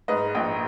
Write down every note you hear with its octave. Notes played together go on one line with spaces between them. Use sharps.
G#2 B4 D#5
A#1 D#5 G5